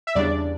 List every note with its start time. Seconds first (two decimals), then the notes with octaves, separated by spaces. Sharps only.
0.07 E5
0.15 E2 C#3 G3 D4 D5